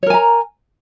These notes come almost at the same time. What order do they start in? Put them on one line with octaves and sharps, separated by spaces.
C#5 A#4 G#5 A#5